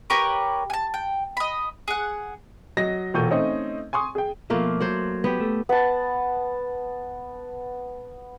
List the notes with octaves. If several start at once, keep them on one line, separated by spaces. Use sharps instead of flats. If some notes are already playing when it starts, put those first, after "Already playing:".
G4 A#4 B4 C#5
G#5 A5
G5
D#5 B5
G#4 F#5
F#3 D#5 A#6
E1 A#2 A4 C#6 G6 D#7
A3 C4 C#4 D#4 C#5 D#5
G#5 C6 C#6 D#6
G#4 G5
B2 F3 A3 A#3 F4
F#3 C5 F#5
B3 G4
A3
B3 A5